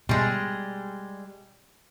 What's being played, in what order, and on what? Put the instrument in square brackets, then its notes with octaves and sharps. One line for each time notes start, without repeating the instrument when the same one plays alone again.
[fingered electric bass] B2 [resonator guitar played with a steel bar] G3 G#3